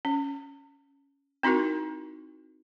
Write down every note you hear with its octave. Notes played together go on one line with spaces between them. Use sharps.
C#4
C4 D#4 E4 F#4 A#4